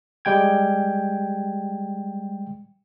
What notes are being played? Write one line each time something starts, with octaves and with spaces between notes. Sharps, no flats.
G3 G#3 G5 G#6